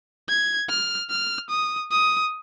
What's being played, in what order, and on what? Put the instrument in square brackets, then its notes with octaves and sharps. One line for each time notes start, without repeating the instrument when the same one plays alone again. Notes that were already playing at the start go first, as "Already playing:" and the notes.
[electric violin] G#6
F6
F6
D#6
D#6